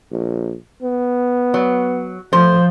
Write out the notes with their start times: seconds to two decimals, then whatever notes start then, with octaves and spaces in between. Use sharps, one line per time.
0.11 A#1
0.82 B3
1.54 F#3
2.33 F3 A3 C5